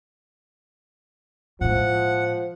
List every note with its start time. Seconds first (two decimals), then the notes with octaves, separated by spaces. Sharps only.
1.61 A2 F3 G#3 F#5